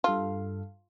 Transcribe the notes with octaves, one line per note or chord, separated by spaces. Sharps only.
G2 F4 A4 F5